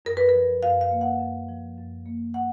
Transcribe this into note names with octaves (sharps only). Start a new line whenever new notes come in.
F#2 A#4
B4
A#4
F3
F#2 F5
F5
A#3
F#5
F#2
F3
F#2
A#3
F#5